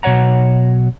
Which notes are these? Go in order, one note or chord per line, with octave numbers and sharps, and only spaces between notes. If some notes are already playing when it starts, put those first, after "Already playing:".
B2 F#3 C#5 F#5 A#5